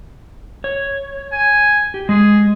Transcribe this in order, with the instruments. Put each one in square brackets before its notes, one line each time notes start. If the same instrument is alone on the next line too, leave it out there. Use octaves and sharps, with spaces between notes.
[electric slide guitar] C#5
[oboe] G#5
[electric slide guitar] G4
[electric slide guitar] G#3 [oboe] G#4